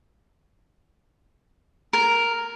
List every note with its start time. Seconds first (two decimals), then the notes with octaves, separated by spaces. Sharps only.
1.93 A#4